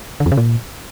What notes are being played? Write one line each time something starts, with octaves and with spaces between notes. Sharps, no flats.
D3
F2
C#3
A#2